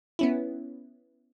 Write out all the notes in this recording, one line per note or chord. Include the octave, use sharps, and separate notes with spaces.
B3 C#4 E4